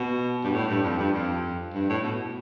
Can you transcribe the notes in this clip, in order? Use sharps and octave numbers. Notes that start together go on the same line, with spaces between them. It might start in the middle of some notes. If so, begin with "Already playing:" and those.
Already playing: B2
G2
A2
G2
F2
G2
F2
G2
A2
B2